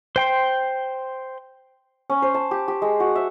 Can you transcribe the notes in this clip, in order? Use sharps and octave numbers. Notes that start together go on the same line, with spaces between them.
C5 G5 C6
C#4
C5
A5
G4
G4
G#3
F#4
E5